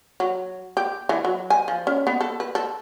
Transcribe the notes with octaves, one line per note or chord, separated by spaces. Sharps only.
F#3
G4
E3
F#3
G#5
F3
C#4
B3
A4
B4
A4